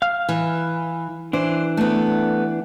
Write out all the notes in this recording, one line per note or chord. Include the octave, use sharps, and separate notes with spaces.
F5 F6
E3
E3 D4 C5
A3 B3